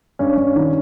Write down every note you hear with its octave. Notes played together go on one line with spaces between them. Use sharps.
G2 C#4
G2
D#3